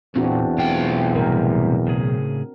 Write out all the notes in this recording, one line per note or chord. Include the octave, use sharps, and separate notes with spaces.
E2 A#2 C4 D4 F#4
B1 A3 A#3 F4 G5
A2 C3 G3 A#4
A2 C#3 G#4